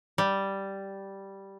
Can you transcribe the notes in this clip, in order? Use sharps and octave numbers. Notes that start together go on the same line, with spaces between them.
G3